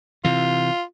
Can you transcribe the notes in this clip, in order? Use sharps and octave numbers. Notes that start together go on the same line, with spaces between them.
C3 E3 F4